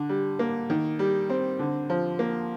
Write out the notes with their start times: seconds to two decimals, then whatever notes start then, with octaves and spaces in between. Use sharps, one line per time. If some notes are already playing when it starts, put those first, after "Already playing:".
Already playing: D3
0.09 G3
0.39 A#3
0.70 D#3
0.99 G3
1.29 C4
1.59 D3
1.90 F3
2.19 A#3